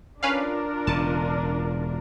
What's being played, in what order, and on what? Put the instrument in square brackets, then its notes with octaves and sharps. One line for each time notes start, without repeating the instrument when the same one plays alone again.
[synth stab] C#4 B4 F5 [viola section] D4 F4 A#4
[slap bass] E1 C#3 [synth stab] A5